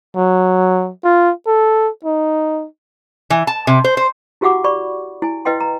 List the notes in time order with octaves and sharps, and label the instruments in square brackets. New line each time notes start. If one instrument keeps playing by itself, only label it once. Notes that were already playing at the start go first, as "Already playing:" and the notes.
[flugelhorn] F#3
F4
A4
D#4
[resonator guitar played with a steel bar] E3
A5
C3
C5
C5
[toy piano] E4 F#4 G4 F5 F#5 D6
D5 B5 C#6
E4 G#5
E4 B4 D#5 F5 G5 C6
A#5